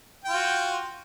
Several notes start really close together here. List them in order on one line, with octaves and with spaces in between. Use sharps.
G5 F4 F#4